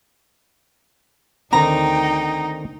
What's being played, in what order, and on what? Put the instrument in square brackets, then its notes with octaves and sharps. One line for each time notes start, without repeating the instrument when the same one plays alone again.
[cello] D2 G5 [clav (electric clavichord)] D3 D#3 C4 [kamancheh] D#4 [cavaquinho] A#5